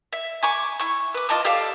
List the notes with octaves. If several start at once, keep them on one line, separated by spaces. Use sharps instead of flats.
E5
G#5 C#6 D6
E4 C#6
B4 D6
F4 D#5 A5 D6
G4 A4 D5 F5